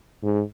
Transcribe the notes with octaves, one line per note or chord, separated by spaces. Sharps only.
G#2